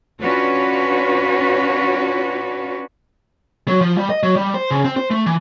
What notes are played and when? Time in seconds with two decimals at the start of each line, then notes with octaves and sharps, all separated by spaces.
0.21 C#4 D4 F4 F#4 B4 C#5
3.68 F#3
3.81 F3
3.97 G3
4.10 D#5
4.23 F#3
4.36 G3
4.54 C5
4.70 C#3
4.84 C4
4.97 C5
5.10 A3
5.26 E3